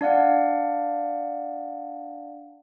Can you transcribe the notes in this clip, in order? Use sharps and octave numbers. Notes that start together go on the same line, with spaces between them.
D4 D5 F5 F#5